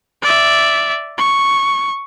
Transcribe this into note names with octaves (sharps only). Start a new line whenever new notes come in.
D5 E5
C#6